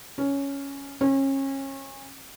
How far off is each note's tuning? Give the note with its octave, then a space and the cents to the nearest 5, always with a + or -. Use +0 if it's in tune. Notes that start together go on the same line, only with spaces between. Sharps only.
C#4 +5
C#4 -30